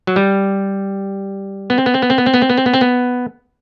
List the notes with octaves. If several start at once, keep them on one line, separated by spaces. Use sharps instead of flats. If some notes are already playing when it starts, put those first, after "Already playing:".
F#3
G3
B3
C4
B3
C4
B3
C4
B3
C4
B3
C4
B3
C4
B3
C4
B3